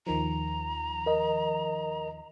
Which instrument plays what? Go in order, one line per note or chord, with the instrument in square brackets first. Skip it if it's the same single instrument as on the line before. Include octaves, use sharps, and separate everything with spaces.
[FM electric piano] D#2 D#3 F3 [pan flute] A#5
[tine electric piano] A#4 D#5